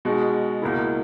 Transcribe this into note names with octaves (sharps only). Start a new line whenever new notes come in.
B2 G#3 D#4 F#4
C#2 B2 A#3 E4